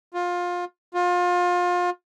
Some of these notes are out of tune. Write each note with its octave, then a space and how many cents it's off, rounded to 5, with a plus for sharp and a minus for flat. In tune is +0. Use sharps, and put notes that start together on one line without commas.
F4 +20
F4 +30